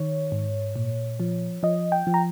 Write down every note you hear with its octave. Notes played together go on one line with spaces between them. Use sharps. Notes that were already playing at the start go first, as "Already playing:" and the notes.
Already playing: D#3 C#5
G#2
A#2
F3
F3 D#5
G5
F3
A#5